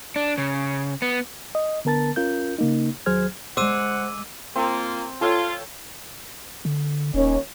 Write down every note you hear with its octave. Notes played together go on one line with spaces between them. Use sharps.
D4
C#3
B3
D#5
D3 B3 A#4 A5 A6
C#4 F4 A#4 G6
C#3 A#3 D#4
D#2 F#3 G#4 C5 F6 G#6
G#3 C5 F#5 D6 E6 D#7
A#3 C4 F4
F4 A4 C#5 G5
D3
D#1 D#2 C#4